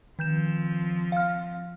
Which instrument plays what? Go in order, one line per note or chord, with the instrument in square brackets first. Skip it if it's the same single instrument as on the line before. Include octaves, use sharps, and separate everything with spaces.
[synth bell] D#3 G6 E7 [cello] F3 C4
[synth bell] F5 F6